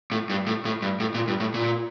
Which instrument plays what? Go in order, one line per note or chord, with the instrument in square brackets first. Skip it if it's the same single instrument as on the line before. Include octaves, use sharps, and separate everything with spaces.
[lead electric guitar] A2
G2
A2
A2
G2
A2
A#2
G2
A2
A#2